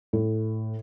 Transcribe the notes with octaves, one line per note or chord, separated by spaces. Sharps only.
A2